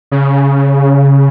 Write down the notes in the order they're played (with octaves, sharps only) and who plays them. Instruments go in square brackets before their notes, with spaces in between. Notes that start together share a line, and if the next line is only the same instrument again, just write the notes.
[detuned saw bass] C#3